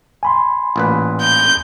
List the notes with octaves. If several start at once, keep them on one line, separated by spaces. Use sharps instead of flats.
G#5 B5 C6
A1 A#2 B4
G6